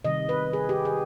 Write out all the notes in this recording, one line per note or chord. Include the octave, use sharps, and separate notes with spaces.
C3 D#3 G3 D#5
B4
G#4
G4
G#4